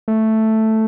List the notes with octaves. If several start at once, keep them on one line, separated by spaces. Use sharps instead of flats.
A3